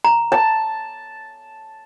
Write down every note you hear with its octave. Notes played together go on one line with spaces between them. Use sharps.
A#5
A5